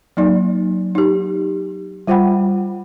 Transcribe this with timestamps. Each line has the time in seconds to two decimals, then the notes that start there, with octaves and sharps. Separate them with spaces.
0.17 F#3 A#3 D#4 D5
0.95 D#4 G4
2.07 G3 F4 C5 F#5 G5 B5